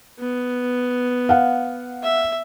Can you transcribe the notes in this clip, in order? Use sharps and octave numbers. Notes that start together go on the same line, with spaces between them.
B3
F5 F#5
E5